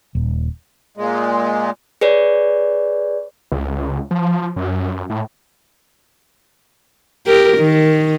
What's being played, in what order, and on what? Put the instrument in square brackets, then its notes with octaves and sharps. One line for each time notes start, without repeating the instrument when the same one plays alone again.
[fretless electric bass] D#1
[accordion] A#2 G#3
[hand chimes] G#4 B4 C#5 D5
[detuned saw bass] C#2
F3
F#2
A2
[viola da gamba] G4 A#4
D#3